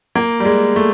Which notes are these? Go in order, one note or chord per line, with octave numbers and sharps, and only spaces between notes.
A#3
G3
G#3
A3